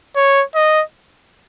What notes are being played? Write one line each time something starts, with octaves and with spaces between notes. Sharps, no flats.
C#5
D#5